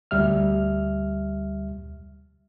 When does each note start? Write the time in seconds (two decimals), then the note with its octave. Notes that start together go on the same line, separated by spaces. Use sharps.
0.11 D2 G3 E5 F6